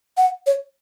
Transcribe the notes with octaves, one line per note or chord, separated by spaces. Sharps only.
F#5
C#5